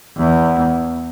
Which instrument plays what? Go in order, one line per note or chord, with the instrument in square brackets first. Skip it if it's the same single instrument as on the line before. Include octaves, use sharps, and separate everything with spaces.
[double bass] E2